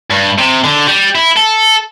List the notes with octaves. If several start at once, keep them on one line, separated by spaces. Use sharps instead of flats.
G2
C3
D3
G3
E4
A4